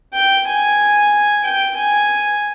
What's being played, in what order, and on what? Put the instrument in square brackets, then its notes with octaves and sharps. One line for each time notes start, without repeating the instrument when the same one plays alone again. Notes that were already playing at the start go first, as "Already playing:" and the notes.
[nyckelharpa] G5
G#5
G5
G#5